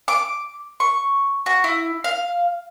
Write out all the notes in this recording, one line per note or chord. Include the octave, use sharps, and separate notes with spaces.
D6
C#6
F#4
E4
F5